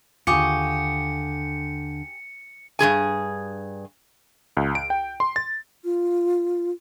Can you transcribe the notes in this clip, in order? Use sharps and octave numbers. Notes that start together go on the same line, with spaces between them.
D#2 D3 F4 G4 G#4 C#6 C#7
G2 E3 G#4 G#5
C#2
D7
G5
C6
A6
F4